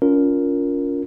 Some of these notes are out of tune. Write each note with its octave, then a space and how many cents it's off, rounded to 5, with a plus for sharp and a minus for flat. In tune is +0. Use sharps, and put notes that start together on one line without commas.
C#4 +30 F4 +0 A#4 +0